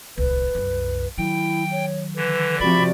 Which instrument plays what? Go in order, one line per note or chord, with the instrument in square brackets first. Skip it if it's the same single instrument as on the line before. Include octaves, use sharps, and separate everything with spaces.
[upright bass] D1 C2 [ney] B4
[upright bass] C2 F#2
[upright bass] D#3 F#3 [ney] E4 [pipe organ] G5
[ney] C#5
[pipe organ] D3 E3 [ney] B4
[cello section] C3 F3 D5 [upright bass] F4 [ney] F#4 [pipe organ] E5 B5